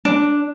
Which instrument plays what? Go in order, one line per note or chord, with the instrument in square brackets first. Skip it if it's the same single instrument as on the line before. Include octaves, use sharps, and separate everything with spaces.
[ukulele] D4